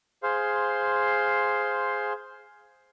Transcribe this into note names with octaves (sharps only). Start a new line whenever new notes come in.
G#4 C5 F5 C6